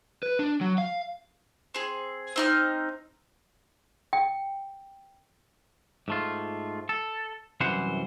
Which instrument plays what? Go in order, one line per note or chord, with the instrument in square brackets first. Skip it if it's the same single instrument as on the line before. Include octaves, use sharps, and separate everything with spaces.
[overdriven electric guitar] B4
D4
F#3
F5
[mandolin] C4 G#4
C4 D#4 F6
[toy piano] G5
[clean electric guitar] G#2 A3 F4
A4
C2 F#2 E3 C5 F#5